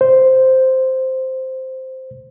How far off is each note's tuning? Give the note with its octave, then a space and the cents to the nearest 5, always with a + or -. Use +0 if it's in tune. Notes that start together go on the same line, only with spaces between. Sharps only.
C5 -5